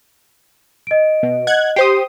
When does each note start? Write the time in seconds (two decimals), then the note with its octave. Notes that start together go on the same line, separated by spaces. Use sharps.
0.87 D#5 D7
1.23 B2
1.47 D#5 F#5 F#6 G#6
1.76 G4 C5 D#6 C7